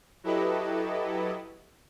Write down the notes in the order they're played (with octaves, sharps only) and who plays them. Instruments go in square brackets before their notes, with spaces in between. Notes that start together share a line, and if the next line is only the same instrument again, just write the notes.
[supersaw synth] F#3 E4 G4 A4 B4 D#5